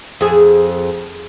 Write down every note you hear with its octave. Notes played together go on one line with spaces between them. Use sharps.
F2 G#4